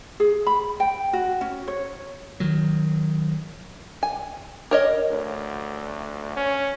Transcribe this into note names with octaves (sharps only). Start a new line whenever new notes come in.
G#4
B5
G5
F#4
C#4
C#5
D#3 F#3
G#5
A#4 C#5 D#5
D2
C#4